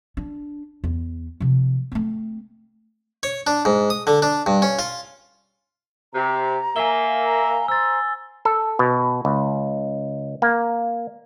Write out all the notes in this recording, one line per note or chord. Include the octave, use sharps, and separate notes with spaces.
D4
E2
C3 F3
A3 C4
C#5
D4
G#2
D#6
D3
D4
G2
C#4
F4
C3 A#5
A#3 E5 G#5 G7
F5 A#5
C5 G#5 A#5 E6 A6
A4
B2
C#2
A#3